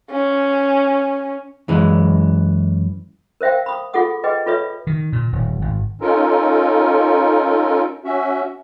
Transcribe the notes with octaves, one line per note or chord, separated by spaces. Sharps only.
C#4
F#2 E3 G#3
A#4 C5 E5 F5 G5
B5 D#6
F4 G#4 A4 F#5 D#6
G#4 B4 D#5 G5
F4 A4 B4 C#5 E5
D#3
A#2
D#1
G#1
C#4 D#4 F4 A4 A#4
C#4 F#4 E5